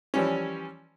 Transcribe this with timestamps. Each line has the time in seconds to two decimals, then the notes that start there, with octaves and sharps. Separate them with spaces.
0.14 E3 F3 G3 C#4